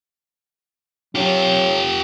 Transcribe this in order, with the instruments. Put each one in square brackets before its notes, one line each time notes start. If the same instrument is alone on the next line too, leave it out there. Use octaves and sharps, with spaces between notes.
[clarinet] F#3 [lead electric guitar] F4 G4